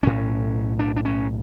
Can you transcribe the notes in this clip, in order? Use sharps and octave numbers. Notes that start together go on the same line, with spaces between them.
B1 A2 C#4
D4
D4
C#4